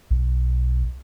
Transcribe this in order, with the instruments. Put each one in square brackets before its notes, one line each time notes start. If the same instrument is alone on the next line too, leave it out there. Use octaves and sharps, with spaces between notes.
[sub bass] B1